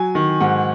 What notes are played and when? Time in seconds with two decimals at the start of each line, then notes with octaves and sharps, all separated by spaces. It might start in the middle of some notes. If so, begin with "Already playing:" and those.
Already playing: F#3 G#5
0.15 D#3
0.40 G#2 F#5